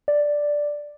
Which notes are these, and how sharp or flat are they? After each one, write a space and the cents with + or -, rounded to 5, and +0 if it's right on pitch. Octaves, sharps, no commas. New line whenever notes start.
D5 +0